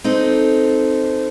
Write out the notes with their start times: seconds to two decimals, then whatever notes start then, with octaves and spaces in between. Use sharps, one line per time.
0.04 C4 D#4 A4